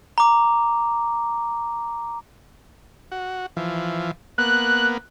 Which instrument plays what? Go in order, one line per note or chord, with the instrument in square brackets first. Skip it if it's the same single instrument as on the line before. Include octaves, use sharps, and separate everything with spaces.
[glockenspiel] A#5 D6
[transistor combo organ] F#4
E3 F3
[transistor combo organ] A#3 B3 [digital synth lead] F#6